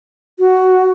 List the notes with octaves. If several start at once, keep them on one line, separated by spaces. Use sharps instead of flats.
F#4